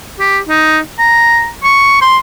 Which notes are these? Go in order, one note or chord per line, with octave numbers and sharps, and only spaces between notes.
G4
D#4
A#5
C#6
C6